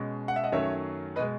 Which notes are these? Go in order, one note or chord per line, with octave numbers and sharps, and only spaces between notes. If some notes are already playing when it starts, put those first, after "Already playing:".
Already playing: B2 G#3 C#4
F#5
E5
D#5 F#5
F#2 D#3 F#3 A3 C#4 C#5 E5
B2 G#3 B4 D#5